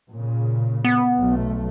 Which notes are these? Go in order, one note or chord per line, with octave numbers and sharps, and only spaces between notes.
A#2 C#3
B3
B1 A3